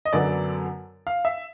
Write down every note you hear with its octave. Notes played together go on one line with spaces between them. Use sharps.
D#5
F#2 D3 F#3 B3 D5
F5
E5